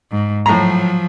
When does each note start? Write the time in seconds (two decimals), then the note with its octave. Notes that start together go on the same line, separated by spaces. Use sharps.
0.11 G#2
0.46 A2 F3 F#3 A#5